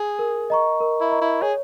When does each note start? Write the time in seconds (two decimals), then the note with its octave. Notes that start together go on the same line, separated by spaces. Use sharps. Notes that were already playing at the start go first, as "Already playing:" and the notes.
Already playing: G#4
0.19 A#4
0.50 D#5 A#5 C#6
0.80 A#4
1.01 E4
1.11 D#5 A#5 C#6
1.21 E4
1.42 G#4 C#5